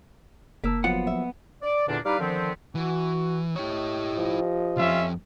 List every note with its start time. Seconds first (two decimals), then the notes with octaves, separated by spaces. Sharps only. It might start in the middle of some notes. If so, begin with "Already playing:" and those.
0.64 F#1 A#3 A5 E6 B6
0.84 F3 F#3 A#3 B3 F4 F#5
1.07 E5
1.62 D5
1.87 E2 A#2 D3 A#3 D4
2.05 G3 D#4 E4 B4 D5 F5
2.19 D3 D#3 F3 B3 C4
2.75 E3 F#4
3.56 E4 G4 C#5 D#5
4.17 F3
4.77 C2 F2 C#4 F4 E5